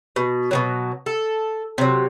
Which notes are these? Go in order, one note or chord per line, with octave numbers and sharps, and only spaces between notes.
B2
B2 D#3 F#3
A4
C3 F#3